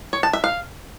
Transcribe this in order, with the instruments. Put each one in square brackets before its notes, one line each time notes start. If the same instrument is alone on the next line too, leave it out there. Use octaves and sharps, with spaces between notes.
[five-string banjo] C#5
A5
E5
F5